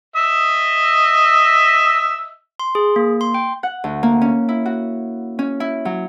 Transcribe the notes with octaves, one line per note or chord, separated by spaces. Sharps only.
D#5 E5 E6
C6
G#4
A#3
C6
G5
F#5
D2
A#3
C#4
E4
F#4
C#4
E4
F#3